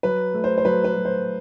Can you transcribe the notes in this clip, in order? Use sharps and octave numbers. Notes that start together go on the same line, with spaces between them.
F#3 B4
A3
C5
C5
F#3 B4
B4
F#3
C5